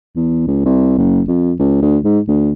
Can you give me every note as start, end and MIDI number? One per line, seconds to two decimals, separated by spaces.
0.16 0.46 40
0.47 0.62 37
0.65 0.98 36
0.98 1.22 30
1.28 1.54 41
1.59 1.79 37
1.82 1.98 38
2.05 2.20 44
2.28 2.52 38